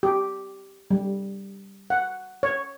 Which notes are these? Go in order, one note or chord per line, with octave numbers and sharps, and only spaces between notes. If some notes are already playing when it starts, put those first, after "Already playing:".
G4
G3
F#5
C#5